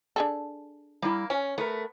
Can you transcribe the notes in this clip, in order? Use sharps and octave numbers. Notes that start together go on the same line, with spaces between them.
D4 G#4 A4
G3 A#3 E4
C#4 G#5
A3 B3 A#4